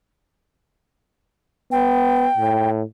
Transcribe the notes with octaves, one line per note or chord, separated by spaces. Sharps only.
B3 G5
A2